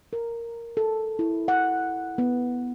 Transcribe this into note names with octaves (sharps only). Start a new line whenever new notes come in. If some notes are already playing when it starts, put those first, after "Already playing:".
A#4
A4
E4
F#5
B3